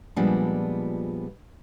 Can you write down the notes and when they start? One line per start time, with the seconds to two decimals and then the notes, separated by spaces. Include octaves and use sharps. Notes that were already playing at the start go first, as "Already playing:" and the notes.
0.16 A#2 F3 G3 G#3 B3 D4